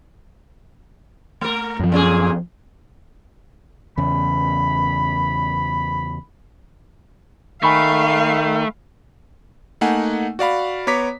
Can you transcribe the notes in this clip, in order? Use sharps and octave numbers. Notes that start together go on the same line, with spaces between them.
A3 A#4
F#2 F3
A#2 C#4 G#4
E2 C#3 B5
D#3 A3 F5 G#5 B5 C#6
A3 A#3 D#4 F#5 G#5
F#4 D5 F5 B5
B3 C#5 A#5 D6 B6